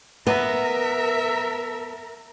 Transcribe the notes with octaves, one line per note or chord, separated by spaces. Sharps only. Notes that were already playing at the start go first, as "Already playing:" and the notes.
B3 A#4 E5